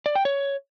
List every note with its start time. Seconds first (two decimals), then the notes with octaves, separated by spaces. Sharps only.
0.06 D5
0.15 G5
0.25 C#5